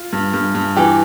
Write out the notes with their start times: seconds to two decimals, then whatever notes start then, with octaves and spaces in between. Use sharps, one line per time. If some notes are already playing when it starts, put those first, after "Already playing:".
Already playing: F4
0.13 G2
0.34 G2
0.55 G2
0.77 E3 G4